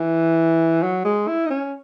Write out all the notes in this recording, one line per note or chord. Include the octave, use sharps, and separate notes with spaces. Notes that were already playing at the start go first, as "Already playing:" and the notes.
Already playing: E3
F#3
G#3
E4
D#4
C#4